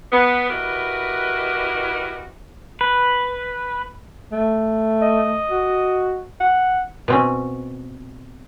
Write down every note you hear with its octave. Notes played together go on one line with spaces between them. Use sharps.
B3
E4 F#4 G4 A#4 B4 D#5
B4
A3
D#5
F#4
F#5
B2 C4 C#4